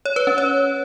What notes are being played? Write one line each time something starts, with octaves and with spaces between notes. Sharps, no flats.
C#5
B4
C#4
C#5